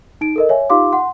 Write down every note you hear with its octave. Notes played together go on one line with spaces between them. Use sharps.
D#4 D7
A4 A#4 D#5
C#5 E5 G#5
D#4 F4 G4 F5 C6 D6
F#5 C6